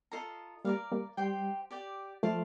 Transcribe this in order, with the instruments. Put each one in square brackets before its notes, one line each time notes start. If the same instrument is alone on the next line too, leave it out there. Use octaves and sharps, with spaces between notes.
[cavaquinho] F4 A4 D#5 A#5
[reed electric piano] G3 A#3 [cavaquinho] A#4 D5 F5
[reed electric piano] G3 A#3
[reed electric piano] G3 [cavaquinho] G4 C5 G5 C6
[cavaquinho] G4 D5 G5
[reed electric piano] F3 A3 [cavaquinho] D5 F5 A5 C6